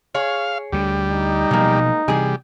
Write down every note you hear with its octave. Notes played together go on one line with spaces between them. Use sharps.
G#4 C#5 F5
D2 D3 G3
D#4
B2 F3 F#3 G#3 A#3
C3 E3 G3 G#4 G#5